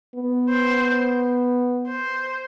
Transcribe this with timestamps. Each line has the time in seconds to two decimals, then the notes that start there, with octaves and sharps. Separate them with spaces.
0.16 B3
0.50 C5
1.88 C5